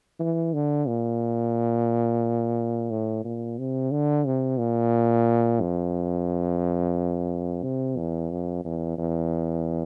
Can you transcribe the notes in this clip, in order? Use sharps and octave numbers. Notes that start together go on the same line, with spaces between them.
E3
D3
A#2
A2
A#2
C3
D3
C3
A#2
F2
C3
E2
F2
E2
E2